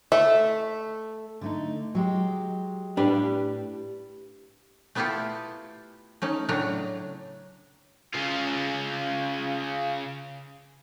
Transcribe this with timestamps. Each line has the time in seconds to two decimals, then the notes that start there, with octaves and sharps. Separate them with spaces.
0.12 A3 E5
1.41 D3 A3 D#4
1.95 F#3 G#3 G4
2.97 A2 D4 G4 B4
4.95 A3 B3 E4 F4 G4 A4
6.22 A3 C#4 D#4
6.49 A2 C#3 F#3 A3 D4 A#5
8.14 C#3 F4